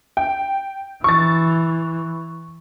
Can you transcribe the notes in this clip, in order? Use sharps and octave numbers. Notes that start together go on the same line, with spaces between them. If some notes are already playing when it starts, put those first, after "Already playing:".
G5
E3 C#6 A6